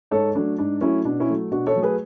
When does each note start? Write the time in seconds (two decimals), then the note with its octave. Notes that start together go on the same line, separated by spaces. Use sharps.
0.11 G#2 A4 C#5
0.35 F#3 A3 D4
0.58 G#2 D4
0.81 F#3 A3 C#4 E4
1.05 B2 D4
1.20 C#4 E4
1.29 F#3 A3
1.51 B2 D4 F#4
1.67 A4 C#5
1.75 F#3 A3
1.82 G#4 B4